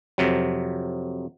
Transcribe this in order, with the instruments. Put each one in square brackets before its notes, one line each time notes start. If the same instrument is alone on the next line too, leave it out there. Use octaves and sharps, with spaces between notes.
[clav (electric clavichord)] F2 C3 F#3